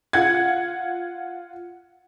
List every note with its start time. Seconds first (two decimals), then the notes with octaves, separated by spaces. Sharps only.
0.13 F4 F#5 G#6